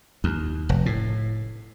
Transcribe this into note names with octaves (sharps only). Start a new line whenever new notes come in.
D#2
F1
A2